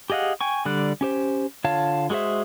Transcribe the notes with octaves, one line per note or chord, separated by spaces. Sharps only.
G4 G#4 D#5 F5 F#5
G5 G#5 C#6
D3 G3 D5 F#6
C#4 G4 C5
D3 F4 C#5 F5 A5
G#3 F#4 G#4 C5 E5